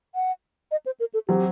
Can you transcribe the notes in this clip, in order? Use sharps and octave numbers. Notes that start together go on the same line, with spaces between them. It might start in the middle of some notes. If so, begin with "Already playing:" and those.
F#5
D#5
C5
A#4
A4
F#3 C4 G4